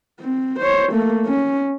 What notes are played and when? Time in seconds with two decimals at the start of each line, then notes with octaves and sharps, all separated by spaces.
0.20 C4
0.59 C5 C#5
0.92 A3 A#3
1.26 C#4